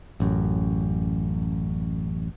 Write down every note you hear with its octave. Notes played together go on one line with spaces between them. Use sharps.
A1 F#2